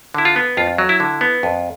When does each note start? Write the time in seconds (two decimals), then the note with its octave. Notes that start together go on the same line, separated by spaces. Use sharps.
0.14 D3 E4
0.25 F4
0.36 B3
0.57 F2 F4
0.78 F#3
0.89 E4
1.00 D3
1.21 B3
1.43 F2